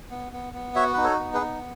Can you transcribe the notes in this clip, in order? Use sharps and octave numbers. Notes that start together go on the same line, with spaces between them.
B3
B3
B3
F#4 C#5 E5
D#4 B4
A4 C#5
B3
G#4 B4
D#4